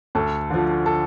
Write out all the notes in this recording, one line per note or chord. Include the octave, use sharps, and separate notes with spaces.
D2 A4
D3 F3
A4